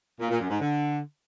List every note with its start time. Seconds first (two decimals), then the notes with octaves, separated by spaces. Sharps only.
0.20 A#2
0.30 A#2
0.40 F#2
0.50 G#2
0.60 D3